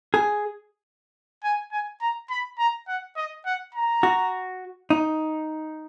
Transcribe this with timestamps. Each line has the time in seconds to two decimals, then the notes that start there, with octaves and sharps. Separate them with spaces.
0.14 G#4
1.43 G#5
1.72 G#5
2.02 A#5
2.30 B5
2.58 A#5
2.88 F#5
3.17 D#5
3.46 F#5
3.75 A#5
4.03 F#4
4.90 D#4